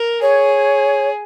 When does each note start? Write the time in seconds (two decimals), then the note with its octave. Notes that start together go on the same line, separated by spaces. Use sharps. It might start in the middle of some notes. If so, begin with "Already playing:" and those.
Already playing: A#4
0.22 G#4 C#5